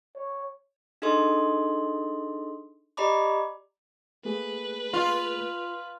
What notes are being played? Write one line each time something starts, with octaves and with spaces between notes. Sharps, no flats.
C#5
D4 D#4 G#4 A4 D#5 C6
G4 D5 D#5 A#5 B5 D6
A3 A#3 G#4 B4
F4